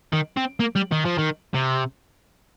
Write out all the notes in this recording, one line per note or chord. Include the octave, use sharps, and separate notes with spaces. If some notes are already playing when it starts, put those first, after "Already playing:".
D#3
C4
A#3
G3
D#3
F3
D#3
C3